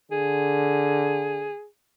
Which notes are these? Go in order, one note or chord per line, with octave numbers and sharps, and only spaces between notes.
D3 G#4